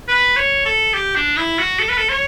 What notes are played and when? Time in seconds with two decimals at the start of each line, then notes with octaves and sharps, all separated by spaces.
0.08 B4
0.37 C#5
0.66 A4
0.94 G4
1.16 D4
1.37 E4
1.59 F#4
1.80 A4
1.89 B4
1.97 A4
2.09 C#5